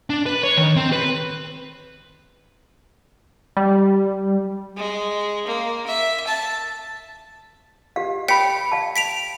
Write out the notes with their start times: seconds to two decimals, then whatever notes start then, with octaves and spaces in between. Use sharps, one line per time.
0.10 D4
0.26 B4
0.44 C#5
0.57 D#3
0.76 C4
0.92 B4
3.57 G3
4.77 G#3
5.47 A#3
5.86 E5
6.27 A5
7.96 G4 F5
8.28 C#5 G5 B5 B6 C#7
8.72 F5 A5
8.96 B6 D7 F7